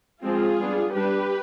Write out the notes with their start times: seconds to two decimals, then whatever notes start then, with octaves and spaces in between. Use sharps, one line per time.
0.23 F3 G#3 C4 F4 G#4
0.59 G3 B3 D4
0.93 G3 D4 G4 B4